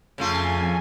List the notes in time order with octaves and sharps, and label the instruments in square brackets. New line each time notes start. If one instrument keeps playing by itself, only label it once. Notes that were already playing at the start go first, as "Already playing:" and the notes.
[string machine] F2 G#5 [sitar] C#3 A3 F4